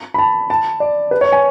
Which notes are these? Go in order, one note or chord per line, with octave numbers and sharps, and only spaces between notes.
B5
A5
A5
D5
B4
C#5
G#5